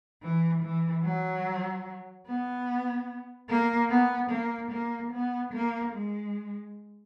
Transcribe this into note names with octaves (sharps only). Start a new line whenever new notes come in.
E3
E3
F#3
B3
A#3
B3
A#3
A#3
B3
A#3
G#3